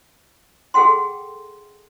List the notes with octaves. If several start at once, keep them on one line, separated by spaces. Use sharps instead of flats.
G#4 A4 F#5 G5 C6